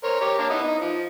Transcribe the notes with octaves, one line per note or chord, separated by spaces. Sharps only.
A#4 C5 C#5
G4 A#4 C#5
A#3 D4
B3 D#4 E4
D#4
F3